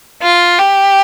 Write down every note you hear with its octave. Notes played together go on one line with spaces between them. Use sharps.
F4
G4